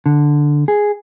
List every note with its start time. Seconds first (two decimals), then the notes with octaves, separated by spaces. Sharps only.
0.06 D3
0.68 G#4